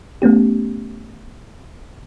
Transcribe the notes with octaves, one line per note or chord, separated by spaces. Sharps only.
A3 B3 C#4 G4